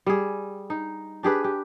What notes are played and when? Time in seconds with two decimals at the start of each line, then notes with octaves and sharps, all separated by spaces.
0.06 G3 G#4
0.70 D#4
1.23 D4 G4 G#4 B4
1.44 G4